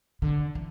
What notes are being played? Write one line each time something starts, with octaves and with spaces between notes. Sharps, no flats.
D3
E3